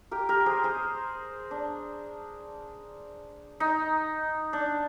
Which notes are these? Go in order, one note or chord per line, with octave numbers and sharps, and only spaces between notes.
G4 A#4
G4 A#4
G#4 C5
G#4 C5
D4
D#4
D4